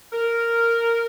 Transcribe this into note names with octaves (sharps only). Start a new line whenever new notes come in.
A#4